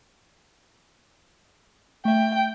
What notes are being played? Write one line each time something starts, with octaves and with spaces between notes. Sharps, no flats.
A3 E5 G5